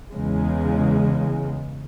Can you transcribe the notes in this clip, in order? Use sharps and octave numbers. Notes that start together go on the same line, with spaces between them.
E2 C#3 G#3